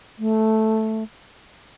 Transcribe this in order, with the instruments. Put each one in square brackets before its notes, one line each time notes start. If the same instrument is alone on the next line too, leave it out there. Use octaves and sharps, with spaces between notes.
[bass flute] A3